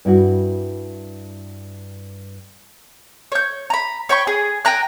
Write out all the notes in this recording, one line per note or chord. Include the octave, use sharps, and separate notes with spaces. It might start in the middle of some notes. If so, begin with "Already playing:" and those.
G2 E4 F#4
C#5 G6
A#5 B5
C#5 G5 B5 C#6
G#4
G5 G#5 A#5 F#6